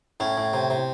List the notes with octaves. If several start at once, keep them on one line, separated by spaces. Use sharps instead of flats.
A2 C#4
A2
C3
C3